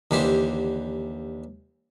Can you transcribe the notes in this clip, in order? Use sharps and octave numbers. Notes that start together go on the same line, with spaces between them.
D#2 D3 E3 G4 C5